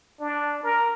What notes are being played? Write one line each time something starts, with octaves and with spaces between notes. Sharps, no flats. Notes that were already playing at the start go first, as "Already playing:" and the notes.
D4
A#4